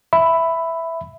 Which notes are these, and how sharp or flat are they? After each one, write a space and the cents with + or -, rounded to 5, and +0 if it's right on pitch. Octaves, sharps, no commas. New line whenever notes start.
E5 +0 B5 +10